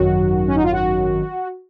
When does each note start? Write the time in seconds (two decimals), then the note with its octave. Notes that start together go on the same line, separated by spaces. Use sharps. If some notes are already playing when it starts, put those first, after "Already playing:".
Already playing: G#1 F#2 D#3 F#3 F#4
0.48 C#4
0.55 D#4
0.63 F4
0.72 F#4